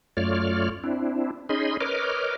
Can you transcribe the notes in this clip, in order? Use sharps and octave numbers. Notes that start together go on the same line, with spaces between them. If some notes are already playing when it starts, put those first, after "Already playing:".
F#2 A3 F4 C#5 D5 F6
C4 D4 E4
C#4 D#4 G#4 D#5 B5 C6
A#4 B4 C#5 D#5 D6 F6